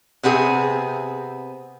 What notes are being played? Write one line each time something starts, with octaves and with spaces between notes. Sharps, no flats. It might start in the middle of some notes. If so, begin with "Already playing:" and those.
C3 B3 C4 F#4 G#4